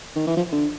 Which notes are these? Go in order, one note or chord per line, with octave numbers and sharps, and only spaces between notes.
D#3
E3
F3
D3